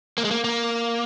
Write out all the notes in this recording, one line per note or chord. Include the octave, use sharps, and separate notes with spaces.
A#3
G#3
A#3
A#3